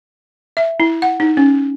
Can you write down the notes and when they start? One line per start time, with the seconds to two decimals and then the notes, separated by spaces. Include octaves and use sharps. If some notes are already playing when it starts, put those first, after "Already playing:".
0.57 E5
0.80 E4
1.02 F#5
1.20 D#4
1.37 C#4